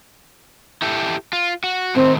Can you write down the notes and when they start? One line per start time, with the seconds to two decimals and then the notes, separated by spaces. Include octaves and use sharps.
0.82 E4 G4 A4
1.33 F4
1.64 F#4
1.95 A2 C3 D#3 C4